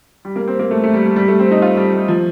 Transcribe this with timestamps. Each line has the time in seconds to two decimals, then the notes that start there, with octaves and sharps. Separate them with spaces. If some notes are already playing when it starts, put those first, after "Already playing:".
0.25 G3
0.36 A#3
0.48 C4
0.59 A#3
0.71 A3
0.84 A3
0.94 G3
1.05 G3
1.16 G3
1.28 A3
1.39 C4
1.51 D#4
1.62 F4
1.77 G3
1.93 G3
2.08 F3